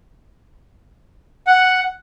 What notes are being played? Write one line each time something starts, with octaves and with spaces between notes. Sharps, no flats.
F#5